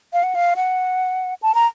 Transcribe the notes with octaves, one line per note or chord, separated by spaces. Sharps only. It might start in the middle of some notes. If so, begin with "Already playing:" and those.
F5
F#5
F5
F#5
A5
A#5